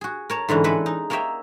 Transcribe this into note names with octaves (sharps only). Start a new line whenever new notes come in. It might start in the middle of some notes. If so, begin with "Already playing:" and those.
F#4 G#4
A#4 C#5 A5
G#2 D3 E3 C#4
G#3 A4 B4 D5 E5 F#5
D#4
A#3 A#4 C#5 D#5 E5 G5